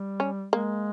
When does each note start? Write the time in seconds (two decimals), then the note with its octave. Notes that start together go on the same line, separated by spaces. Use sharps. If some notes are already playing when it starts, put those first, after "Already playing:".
Already playing: G3
0.20 C#4
0.53 G#3 A#3